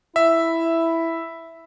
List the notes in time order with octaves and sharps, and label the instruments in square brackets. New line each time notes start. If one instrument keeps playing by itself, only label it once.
[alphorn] E4 [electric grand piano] E5